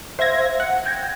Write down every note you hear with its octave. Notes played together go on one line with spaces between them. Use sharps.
C5 E5 F5 G#6 A#6
F#5
G5 G#6 A#6